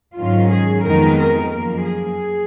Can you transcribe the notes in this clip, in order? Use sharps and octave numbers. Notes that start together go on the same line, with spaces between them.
G#2 D#3 F#3 C#4 F4
G#4
F2 D#3 G#3 B3 D#4 A#4
A#4
F#2 F3 A#3 A#4
G#4